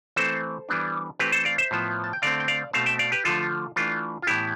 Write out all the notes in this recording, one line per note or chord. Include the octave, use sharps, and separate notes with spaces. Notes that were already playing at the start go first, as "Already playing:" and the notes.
E3 A3 C4 A4 C5
E3 G3 B3 D4
E3 A3 C4 G4 B4
A4 C5
D5 F5
C5 E5
A2 F3 B3
A5
G5
D3 A3 C4 D5 F5
G5
D5 F5
B2 A3 C4 F5 A5
E5 G5
D5 F5
G4 B4
D3 F3 A3 F4 A4
E3 A3 D4 F4
F4
A2 E3 B3 E4 G4